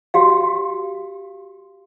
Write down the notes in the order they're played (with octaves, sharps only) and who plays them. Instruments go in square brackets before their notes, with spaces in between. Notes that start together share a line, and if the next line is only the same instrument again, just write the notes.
[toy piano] F#4 G4 F5